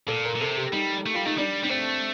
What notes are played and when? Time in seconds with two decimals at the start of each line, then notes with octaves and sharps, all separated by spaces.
0.08 A#2 A4
0.25 A#4
0.36 A#2
0.41 C3 A4
0.57 G4
0.73 G3 D#4
1.06 A3
1.14 G3 F4
1.25 A3 D#4
1.37 G3 D4
1.64 G3 D4
1.69 A3 C4